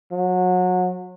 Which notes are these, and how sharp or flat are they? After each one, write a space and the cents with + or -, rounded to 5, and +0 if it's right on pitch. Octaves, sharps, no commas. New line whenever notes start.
F#3 -25